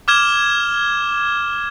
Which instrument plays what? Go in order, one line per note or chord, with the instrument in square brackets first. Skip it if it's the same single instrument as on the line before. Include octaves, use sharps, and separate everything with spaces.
[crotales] D6 F6 G#6 E7 G7